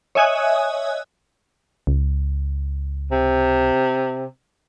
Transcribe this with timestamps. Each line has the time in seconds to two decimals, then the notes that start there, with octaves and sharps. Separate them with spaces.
0.15 C#5 D#5 E5 G#5 D#6 F#6
1.87 C#2
3.11 C3